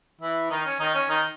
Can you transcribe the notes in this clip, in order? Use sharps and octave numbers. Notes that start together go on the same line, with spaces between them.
E3 E4
D#3 D#4
C#4
D#3 D#4
C#4
D#3 D#4